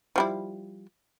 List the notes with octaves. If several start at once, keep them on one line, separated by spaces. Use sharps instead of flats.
F3 G3 E4